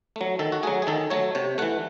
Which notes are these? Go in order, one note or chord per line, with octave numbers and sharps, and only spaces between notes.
F#3 A3
D#3 A4
F#4
F#3 A3 G#4
G#4
D#3 A4
F#3 A3 C#5
C3 C#5
E3 A3 F#5